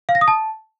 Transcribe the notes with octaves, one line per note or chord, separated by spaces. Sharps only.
F5
A#6
D#6
A5